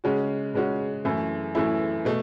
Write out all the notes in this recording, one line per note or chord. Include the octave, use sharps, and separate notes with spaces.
C#3 G#3 C#4 F#4
C#3 G#3 C#4 F#4
F#2 E3 A3 E4
F#2 E3 A3 E4
B2 A3